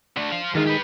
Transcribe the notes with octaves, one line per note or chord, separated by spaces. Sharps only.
D3 A3 D4
C5 F5
D#3 E3 G#3 D#4 F4
G4 B4